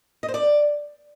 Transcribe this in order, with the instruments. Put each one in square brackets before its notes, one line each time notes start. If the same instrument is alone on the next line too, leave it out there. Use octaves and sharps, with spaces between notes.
[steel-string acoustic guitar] D#5
C5
D5